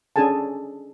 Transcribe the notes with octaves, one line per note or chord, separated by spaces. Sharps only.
C#4 D4 G#4 A4 G#5 A5